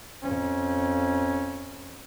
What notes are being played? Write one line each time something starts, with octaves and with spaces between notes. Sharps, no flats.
F2 C#4